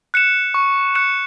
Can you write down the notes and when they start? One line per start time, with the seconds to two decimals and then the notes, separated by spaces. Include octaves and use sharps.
0.14 F#6 C#7 E7
0.54 C#6
0.95 F#6 C#7 E7